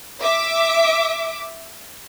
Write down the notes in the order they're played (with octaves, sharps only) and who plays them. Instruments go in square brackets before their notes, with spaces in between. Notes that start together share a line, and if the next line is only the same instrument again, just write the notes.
[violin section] E5 D6